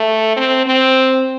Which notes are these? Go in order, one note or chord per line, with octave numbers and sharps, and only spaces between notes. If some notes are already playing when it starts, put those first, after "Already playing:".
Already playing: A3
C4
C4